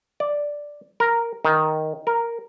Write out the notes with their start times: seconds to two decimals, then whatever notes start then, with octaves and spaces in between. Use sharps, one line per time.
0.20 D5
1.00 A#4
1.45 D#3
2.07 A#4